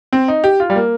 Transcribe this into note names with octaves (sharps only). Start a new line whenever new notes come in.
C4
D#4
G4
F4
G3
A#3